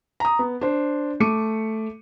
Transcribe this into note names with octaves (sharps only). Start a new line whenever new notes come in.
A#5 D#6
B3
D4 C5
A3 D6 C#7 D#7